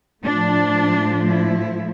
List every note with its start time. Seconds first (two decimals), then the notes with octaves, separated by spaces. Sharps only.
0.24 A2 F3 A3 D4
1.29 E4